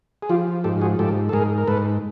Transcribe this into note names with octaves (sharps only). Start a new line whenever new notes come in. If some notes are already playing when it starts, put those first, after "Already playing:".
G#4
F3 F4 G4
G#2 G4 A4
F#4 G#4
G#2 G4 A4
A4
G#2 G#4 A#4
A#4
G#2 A4 B4